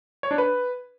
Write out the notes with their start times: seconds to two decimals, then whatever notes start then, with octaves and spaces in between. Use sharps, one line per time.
0.23 C#5
0.31 D4
0.38 B4